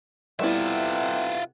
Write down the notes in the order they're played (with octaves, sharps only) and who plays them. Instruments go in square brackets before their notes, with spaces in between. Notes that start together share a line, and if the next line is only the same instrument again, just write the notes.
[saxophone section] C3 A4 F#5 [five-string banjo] G3 B3 E4 [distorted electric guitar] F4 E5